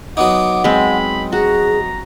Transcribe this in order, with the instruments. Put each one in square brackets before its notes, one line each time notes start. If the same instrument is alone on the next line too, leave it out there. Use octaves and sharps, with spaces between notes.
[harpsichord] F#3 B3 D#4 [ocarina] F#5 [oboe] D6
[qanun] G#3 C4 [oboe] B5
[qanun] F#4 [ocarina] G#4 [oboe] A#5